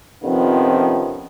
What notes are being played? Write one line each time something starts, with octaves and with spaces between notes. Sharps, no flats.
F2 C3 D#3 F3 B3 C#4